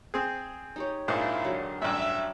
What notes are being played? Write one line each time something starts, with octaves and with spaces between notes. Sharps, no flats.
C4 G#4
D#4 G4 C#5
A#1 G#2 F3 E4 A#4 C5
D3 F#3 G4
A1 G2 E5